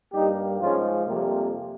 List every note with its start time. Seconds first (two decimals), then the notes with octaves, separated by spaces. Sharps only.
0.12 G2 G3 A#3 D#4 G4
0.60 G#2 F3 G#3 C#4 F4
1.07 F2 C3 G3 A#3